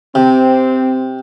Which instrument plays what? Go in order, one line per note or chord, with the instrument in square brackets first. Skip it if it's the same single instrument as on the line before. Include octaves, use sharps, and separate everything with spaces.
[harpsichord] C3 [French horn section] C4